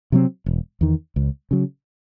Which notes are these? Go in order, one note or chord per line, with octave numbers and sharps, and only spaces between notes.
C3 F#3 C4
E1
E2 D#3
C#2
C#3 F#3